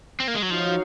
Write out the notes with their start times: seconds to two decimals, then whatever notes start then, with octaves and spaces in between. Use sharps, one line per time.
0.20 C4
0.28 A#3
0.35 G#3
0.42 F#3
0.50 F3 D#4 F#4 C#5 F5